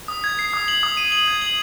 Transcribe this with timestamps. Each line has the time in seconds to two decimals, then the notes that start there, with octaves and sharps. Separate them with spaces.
0.08 D#6
0.24 G#6
0.39 C7
0.54 D#6
0.68 F#7
0.83 D#6
0.97 D#7
1.12 F#7
1.28 G#6
1.42 F#7